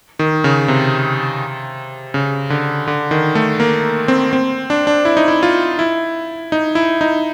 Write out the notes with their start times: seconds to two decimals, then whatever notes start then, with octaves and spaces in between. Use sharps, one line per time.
0.19 D#3
0.44 C#3
0.68 C3
2.14 C#3
2.50 D3
2.88 D3
3.11 D#3
3.35 A3
3.60 A#3
4.08 C4
4.33 C4
4.70 D4
4.87 D4
5.05 E4
5.17 D#4
5.28 E4
5.43 F4
5.79 E4
6.52 D#4
6.75 E4
7.01 D#4